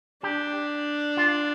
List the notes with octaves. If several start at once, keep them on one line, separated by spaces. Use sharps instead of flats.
D4 G4
F4